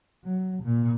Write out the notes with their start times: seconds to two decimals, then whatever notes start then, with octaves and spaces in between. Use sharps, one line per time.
0.25 F#3
0.63 A#2